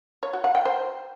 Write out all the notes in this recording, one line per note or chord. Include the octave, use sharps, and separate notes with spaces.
C#5
F#4
F#5
G5
C5